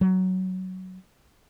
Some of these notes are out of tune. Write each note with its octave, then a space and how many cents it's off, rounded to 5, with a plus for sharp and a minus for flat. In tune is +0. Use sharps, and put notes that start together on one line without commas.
F#3 +10